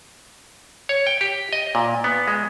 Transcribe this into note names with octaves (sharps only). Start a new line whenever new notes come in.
C#5
G5
G4
D#5
A#2
B3
G#3